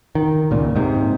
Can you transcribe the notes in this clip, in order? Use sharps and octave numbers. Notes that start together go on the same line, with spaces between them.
D#3
C#2 A#2
G#2 C3